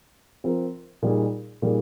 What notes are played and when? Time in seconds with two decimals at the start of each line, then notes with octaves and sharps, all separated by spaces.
0.44 F3 C4 F4 A#4
1.02 A#2 G3 A#3 D#4 G#4
1.62 A#2 G3 A#3 D#4 G#4